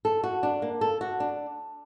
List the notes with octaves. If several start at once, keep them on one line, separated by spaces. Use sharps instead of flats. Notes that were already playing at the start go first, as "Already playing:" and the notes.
A4
F#4
D4
A#3
A4
F#4
D4